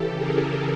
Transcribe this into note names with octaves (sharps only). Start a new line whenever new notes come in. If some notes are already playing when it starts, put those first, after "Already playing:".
Already playing: C#3 E3 G4 A4
G#4 A#4